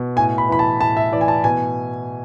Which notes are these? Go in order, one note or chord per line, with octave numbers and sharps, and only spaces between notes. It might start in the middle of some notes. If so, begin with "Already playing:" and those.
Already playing: B2
A2 G#5
B5
E3 B5
A5
A2 A5
E5
E3 D5
G#5
A5
B2 G#5